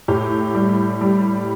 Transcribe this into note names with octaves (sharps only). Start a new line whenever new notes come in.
A2 G4
G3
G3